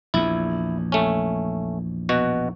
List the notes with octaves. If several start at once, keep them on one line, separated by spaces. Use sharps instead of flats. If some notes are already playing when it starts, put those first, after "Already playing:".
A#1 E2 E4
A3 C#4
B2 F#4